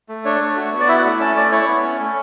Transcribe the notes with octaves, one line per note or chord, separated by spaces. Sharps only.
A3
D4 C#5
A3
F#4
B3
D5
E4 E5
F#5
A3
C#4 A5
A3 D5
E4 C#5
B3
C#4
A3